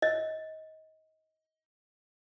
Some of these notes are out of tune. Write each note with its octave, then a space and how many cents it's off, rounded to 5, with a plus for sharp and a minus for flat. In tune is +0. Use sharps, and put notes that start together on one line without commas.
D#5 +25